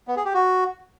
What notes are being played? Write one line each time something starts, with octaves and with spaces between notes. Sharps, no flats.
B3
G#4
G4
F#4